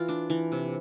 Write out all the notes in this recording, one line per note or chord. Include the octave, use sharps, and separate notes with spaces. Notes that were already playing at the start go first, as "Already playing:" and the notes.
Already playing: E3 F4
D4
E3
C3